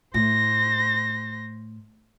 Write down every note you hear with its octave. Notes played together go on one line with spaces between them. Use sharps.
A2 C5 A#6